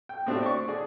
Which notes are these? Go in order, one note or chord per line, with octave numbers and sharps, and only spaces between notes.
G5
A2 A3 C4 D4 F#4 G4
D5 C#6
D3 G#4 D5